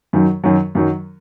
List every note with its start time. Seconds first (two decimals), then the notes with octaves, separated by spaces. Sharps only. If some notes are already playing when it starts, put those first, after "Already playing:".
0.13 F#2 D#3 F#3
0.44 F#2 D#3 F#3
0.75 F#2 D#3 F#3